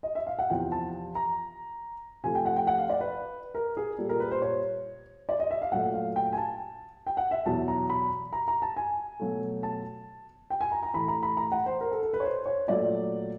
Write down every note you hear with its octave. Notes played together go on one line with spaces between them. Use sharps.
D#5
E5
F5
F#5
E2 C3 F3 G5
A5
A#5
C3 F3 A3 G#5
G5
F#5
G5
F#5
F5
D5
B4
A#4
G#4
A#2 G3 A4
A#4
B4
C5
C#5
D5
D#5
E5
F5
A#2 F#3 A3 F#5
F5
G5
G#5
A5
G5
F#5
E5
E2 B2 F#3 A5
A#5
B5
A#5
A#5
A5
G#5
B2 F#3 A3
A5
G5
G#5
A#5
A#5
A2 E3 A3 B5
A#5
B5
A#5
F#5
C5
A#4
A4
A4
B4
C#5
C5
C#5
A#2 F#3 A3 D5